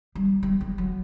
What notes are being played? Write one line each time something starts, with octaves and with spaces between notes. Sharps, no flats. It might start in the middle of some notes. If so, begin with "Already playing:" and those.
G3
G3
G3
F#3